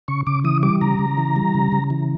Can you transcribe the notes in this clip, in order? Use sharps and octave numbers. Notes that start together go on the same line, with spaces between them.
C#3 C#6
C#3 D6
E3 D#6
G3 D6
C#3 A#5
C#3
E3
G3
C#3
C#3
E3